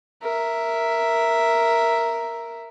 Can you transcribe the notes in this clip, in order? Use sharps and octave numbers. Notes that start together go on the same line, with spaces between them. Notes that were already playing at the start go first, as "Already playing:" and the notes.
A#4 E5